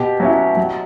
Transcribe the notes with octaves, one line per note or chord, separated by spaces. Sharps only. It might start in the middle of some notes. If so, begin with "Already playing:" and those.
Already playing: B2 G4
F#3 C#4 E4
F#3